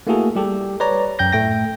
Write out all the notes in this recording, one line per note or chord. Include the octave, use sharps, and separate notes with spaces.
A3 A#3 E4 F#4 G#4 A4
G3 G4 A4
B4 C#5 D5 A#5
F#2 G5 G6 A#6
A2 A3 G5 A#6